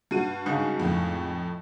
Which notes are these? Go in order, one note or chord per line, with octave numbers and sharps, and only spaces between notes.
G2 F#4 D#7
G#2 C#3
F2 A2